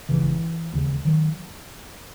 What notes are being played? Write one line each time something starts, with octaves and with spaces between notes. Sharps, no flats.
G#1 F#2 C#3 E3
E1 D#2 C#3
D#3 F#3